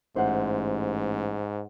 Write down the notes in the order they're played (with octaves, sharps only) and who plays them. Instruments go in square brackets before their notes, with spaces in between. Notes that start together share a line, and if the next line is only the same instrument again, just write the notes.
[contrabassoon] A1 [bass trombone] G#2 [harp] C5 E5 F#5